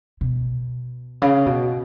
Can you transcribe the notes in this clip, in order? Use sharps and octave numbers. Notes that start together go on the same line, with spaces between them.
B2
C#3
B2